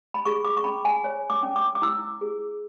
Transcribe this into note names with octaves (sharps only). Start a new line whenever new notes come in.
B5
G#4 C#6
D6
C#6
C#4 B5
G#5
C#5
D6
C#4
D6
D6
E4 E6
G#4